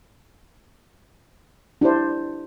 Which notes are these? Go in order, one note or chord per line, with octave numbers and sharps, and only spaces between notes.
D4 E4 G4 C5